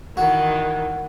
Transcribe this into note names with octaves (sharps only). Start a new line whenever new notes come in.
D#3 E3 F#4